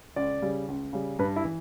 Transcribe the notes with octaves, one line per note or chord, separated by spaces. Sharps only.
C#2 D5
C#3 G3
C#2
C#3 G3
G2 B4
E4
E3